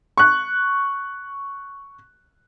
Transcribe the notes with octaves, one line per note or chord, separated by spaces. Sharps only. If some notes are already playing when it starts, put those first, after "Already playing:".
C#6 F#6